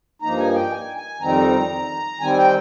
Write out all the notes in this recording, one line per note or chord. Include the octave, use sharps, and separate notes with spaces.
G2 F3 A#3 D#4 A#5
G#5
G5
G#5
G#5
F2 D#3 G3 C4 D#4 A#5
D#3 G3 C4 G#5
G5